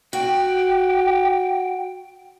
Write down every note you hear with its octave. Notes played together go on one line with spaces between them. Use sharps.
F#4 G5